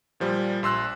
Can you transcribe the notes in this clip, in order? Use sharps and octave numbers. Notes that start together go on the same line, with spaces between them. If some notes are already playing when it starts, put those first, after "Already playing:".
A#2 F3 G3
A#1 C6 E6 F#6